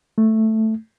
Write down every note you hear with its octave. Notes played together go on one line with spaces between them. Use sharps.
A3